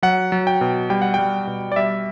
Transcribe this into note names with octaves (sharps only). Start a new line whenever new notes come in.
F#3 F#5
F#3
G5
B2
G3 G5
F#5
G3 G5
B2
D5
G3 E5